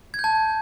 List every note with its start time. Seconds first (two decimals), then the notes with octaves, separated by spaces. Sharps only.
0.14 G#6
0.19 G6
0.24 A5